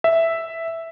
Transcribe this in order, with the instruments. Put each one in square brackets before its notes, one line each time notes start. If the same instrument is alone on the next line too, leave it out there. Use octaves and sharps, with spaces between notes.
[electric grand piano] E5